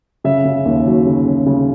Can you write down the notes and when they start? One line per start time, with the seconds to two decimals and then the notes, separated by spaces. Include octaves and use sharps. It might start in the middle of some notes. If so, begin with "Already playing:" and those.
0.24 C#3 E5
0.45 C#3
0.65 D#2
0.86 F#3
1.06 C#3
1.26 C#3
1.46 C#3